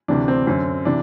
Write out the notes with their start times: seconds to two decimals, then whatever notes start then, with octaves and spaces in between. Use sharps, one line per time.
0.08 D2 C3 E3 D4
0.28 C4
0.47 F#2 D3 C4
0.85 C3 E3 D4